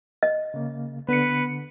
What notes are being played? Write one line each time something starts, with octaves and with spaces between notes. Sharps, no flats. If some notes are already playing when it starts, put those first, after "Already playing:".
D#5
C#3 A#3
D3 B3 B4 C#7